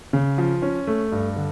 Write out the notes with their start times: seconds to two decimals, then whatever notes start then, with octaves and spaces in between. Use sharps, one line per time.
0.13 C#3
0.38 F3
0.62 C#4
0.87 A3
1.12 G2
1.36 D3